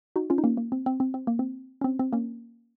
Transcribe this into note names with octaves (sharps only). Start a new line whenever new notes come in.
D#4 F#4
C#4 F4
D#4
A#3 C#4
A#3
C4
C4
C4
C4
A#3
C4
C#4
C4
C4
A#3 C#4